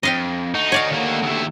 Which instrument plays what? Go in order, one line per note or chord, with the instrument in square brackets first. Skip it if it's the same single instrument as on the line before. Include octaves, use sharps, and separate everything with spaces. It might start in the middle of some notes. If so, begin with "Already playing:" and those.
[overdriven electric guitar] F2 [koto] D#5 F5 G5
[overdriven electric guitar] D3 F#4 [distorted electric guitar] D#4
[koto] C#5 D5 F5
[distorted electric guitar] D#2 A#3
D#2 E4